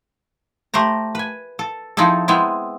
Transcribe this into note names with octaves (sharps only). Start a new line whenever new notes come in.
A3 G4 C5 A#5
B4 G#5
A4
F3 C4 D#4 E4 G#4 A4
G#3 B3 C4 E4